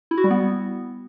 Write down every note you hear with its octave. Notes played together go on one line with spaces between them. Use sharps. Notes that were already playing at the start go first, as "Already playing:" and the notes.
E4
F#4
G3
B3